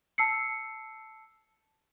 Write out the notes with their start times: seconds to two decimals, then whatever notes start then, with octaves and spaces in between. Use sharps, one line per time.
0.18 A5 E6 C7 C#7